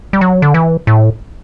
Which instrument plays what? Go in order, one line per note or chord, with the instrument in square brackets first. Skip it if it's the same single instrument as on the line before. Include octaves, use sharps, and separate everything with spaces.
[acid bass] G3
F#3
D3
E3
A2